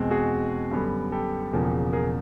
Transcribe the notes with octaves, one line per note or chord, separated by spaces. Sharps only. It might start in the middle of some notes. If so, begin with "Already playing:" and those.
Already playing: E2 B2 G#3 C4
F#4 G#4
F#2 D3 G3 B3
G4 A4
E1 E2 C#3 F3 A#3
G#4 A#4